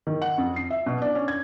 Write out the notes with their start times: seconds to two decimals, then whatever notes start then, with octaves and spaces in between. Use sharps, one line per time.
0.07 D#3
0.22 F#5
0.38 F2
0.56 C7
0.71 E5
0.86 B2
1.02 D4
1.15 C#4
1.28 G#6